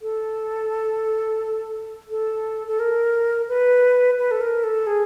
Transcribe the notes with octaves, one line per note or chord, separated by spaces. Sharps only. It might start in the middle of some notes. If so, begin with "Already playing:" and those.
A4
A4
A4
A#4
B4
B4
A4
A#4
A4
G#4